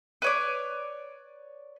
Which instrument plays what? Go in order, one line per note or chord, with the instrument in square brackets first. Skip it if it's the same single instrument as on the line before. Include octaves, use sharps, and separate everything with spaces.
[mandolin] B4 C#5 D5